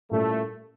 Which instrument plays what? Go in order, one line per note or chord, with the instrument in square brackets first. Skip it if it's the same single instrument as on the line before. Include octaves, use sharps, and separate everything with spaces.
[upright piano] A#2 G3 C#4 E4 [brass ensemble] A3